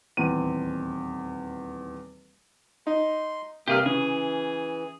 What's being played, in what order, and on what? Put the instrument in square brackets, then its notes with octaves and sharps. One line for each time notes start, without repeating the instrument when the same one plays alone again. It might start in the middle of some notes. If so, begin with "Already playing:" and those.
[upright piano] D#1 E2 C4 D#7
[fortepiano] D#4 [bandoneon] C6
[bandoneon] G2 A#3 [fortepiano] C3 [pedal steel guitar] G4 G#4 F6
[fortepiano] C#3 [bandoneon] E3 [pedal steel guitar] G#4